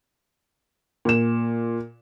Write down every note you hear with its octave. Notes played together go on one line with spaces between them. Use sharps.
A#2 E7